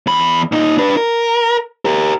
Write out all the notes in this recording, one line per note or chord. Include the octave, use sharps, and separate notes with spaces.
E2 B5
A#2 D#4
D4 B4
A#4
G4 A#4